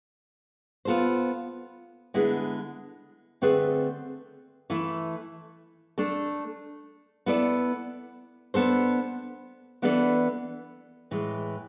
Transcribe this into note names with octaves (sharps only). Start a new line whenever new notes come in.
B3 F4 A4 C5
D3 G#3 B3 E4 G#4
D3 A3 C4 G#4 B4
E3 A3 E4
A3 D4 A4
B3 E4 A4 D5
B3 D4 A4 C5
E3 B3 D4 A4 D5
A2 E3 G#3